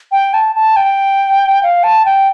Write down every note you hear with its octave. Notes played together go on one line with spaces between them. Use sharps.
G5
A5
A5
G5
F5
A5
G5